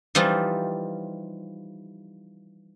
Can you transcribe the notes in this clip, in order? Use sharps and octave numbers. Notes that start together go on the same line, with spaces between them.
E3 F3 G3 D#4 F4